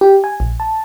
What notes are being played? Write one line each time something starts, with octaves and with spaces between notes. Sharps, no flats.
G4
G#5
A#1
A5